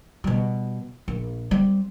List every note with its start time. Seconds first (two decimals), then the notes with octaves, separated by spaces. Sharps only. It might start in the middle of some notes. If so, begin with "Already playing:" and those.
0.24 B2 G3
1.08 A#1
1.51 G3 C4